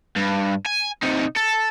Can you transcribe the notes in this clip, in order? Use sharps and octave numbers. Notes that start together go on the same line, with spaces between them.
G2
G#5
C3 D#4
A4